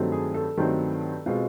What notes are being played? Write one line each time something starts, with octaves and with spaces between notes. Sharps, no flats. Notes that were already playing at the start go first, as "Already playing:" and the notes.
Already playing: G2 D#3 F#3 A3 C4
G#4
A4
G2 D#3 F#3 A3 C4
B2 G#3 C4 F4